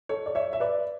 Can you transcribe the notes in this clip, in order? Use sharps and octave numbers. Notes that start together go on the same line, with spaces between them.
A4 C#5
D5
C#5 E5
E5
B4 D5